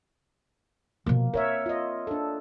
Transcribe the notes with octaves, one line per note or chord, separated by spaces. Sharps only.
B2 F3 A#3
C4 A#4 C#5 E5
F4 D#5
D4 A4